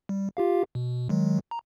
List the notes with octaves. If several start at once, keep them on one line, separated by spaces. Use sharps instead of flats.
G3
F4 G4 F5
B2
D#3 F#3 G#3
A#5